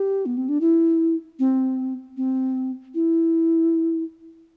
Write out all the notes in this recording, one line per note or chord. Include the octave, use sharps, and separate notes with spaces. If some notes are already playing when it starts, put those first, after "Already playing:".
Already playing: G4
B3
C4
D4
E4
C4
C4
E4